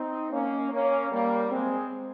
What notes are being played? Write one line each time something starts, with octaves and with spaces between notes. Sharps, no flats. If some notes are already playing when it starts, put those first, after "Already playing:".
Already playing: C4 D#4
A#3 C#4
A#3 C#4
G3 A#3
G#3 C4